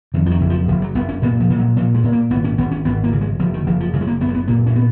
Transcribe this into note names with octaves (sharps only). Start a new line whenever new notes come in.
F2 D#3
F3
D#3
F#1
F3
F#1 F3
F#3
F#1 B3
C#4
A#2 B3
F3
A#2
F#3
A#2 F3
G#3
A#2
A#3
G#1 B3
C#4
G#1 B3
C#4
G#1 B3
A#3
C#3
G#3
F#1 F3
D#3
F#1 F3
F3
C#3 F#3
G#3
A#3
F#1 B3
A#3
B3
A#2 A#3
C#4
B3